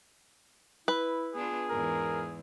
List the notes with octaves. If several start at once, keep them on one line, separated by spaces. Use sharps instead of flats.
E4 B4
B3 D4 F4 G#4
E2 G#2 A#4